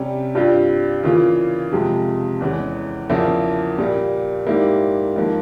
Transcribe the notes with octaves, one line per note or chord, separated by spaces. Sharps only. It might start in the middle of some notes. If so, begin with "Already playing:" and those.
Already playing: C3 G3 C#4
G2 G3 C4 F4
C#3 E3 A#3 F4
F2 C3 F3 G#3
E2 E3 G#3 C#4
E2 C#3 F3 A#3 E4
A#2 G3 A#3
G#2 G3 A#3 E4 G4
G#2 F3 A#3